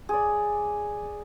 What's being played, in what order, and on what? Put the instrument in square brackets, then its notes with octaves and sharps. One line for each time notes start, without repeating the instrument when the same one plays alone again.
[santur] G#4 D5